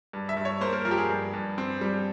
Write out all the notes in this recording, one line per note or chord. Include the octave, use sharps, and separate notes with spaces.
G2
E5
G2
C#5
A#3 C5
A#4
F3 A#4
G4
G#4
G2
G2
C4
G3